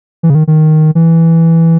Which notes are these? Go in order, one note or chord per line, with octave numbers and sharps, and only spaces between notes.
E3
C#3
D#3
D#3
E3